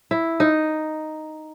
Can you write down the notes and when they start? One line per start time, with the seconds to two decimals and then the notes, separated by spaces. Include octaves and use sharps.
0.11 E4
0.40 D#4